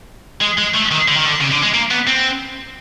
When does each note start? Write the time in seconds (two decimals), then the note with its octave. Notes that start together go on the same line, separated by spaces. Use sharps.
0.41 G#3
0.57 G#3
0.74 A3
0.91 D#3
1.08 D3
1.17 D#3
1.25 D3
1.41 C#3
1.52 D3
1.63 G#3
1.74 A#3
1.91 B3
2.07 C4